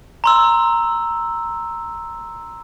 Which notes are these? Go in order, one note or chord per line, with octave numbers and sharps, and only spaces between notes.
A#5 C6 E6